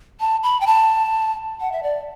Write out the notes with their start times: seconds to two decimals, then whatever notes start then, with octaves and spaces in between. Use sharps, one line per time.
0.20 A5
0.43 B5
0.61 G5
0.67 A5
1.61 F#5
1.72 E5
1.83 D5